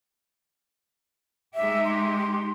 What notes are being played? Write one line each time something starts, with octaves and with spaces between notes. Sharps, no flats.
G#3 D#4 G4 E5
C6